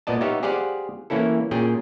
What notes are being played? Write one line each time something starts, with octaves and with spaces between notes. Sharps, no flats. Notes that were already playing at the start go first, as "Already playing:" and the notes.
A#2 B3 D5 D#5 A5
B3 D#4 G4 C#5 E5 F5
G4 G#4 C5 D5 F5 F#5
E3 A#3 C#4 E4 A4
A#2 C#4 G#4 G5